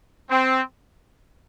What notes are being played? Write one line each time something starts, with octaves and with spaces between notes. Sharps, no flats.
C4